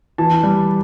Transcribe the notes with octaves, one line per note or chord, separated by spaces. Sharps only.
E3 A5
G3